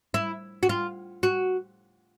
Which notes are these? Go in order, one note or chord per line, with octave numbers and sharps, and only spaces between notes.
E4
F#4
F4
F#4